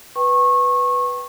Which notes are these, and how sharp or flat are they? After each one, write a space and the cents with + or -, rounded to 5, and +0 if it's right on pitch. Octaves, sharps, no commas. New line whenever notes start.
B4 +0 G5 +0 C#6 -25